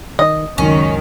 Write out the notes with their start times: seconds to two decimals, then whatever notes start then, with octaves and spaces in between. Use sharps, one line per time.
0.19 D#3 D#5
0.58 C#2 F#2 D#3 C#4